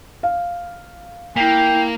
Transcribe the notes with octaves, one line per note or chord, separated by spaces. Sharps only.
F5
A#3 E4 G5 B6 C7